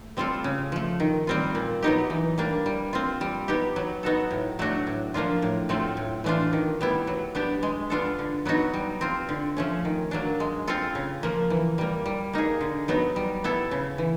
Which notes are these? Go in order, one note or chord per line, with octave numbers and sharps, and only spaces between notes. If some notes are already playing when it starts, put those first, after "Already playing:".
Already playing: A3
G3 C4 F4 A4
C#3
F3 A3
D#3
G3 C4 F4
A#2
F#3 B3 D#4 G4
E3
G3 A#3 D4
G3
C4 F4
G3
B3 D#4 G4
F#3
B3 D#4 F#4 A4
A2
F#3 A3 D4 F#4
A2
F3 A#3 D4 F4
A2
F#3 A3 C4 F4
A2
E3 A3 D4 F4
D#3
G3 B3 E4
F#3
B3 D4 G4
G#3
B3 D4 F4 A4
D3
F#3 B3 D#4 F#4
G3
C4 F4
D3
F3 A3 C#4
D#3
F#3 A#3 D4
G#3
C4 F4 A4
C#3
F3 A#3
E3
G3 A#3
G3
A#3 D#4 G#4
D3
F#3 B3 D#4
G3
B3 E4 A4
C#3
E3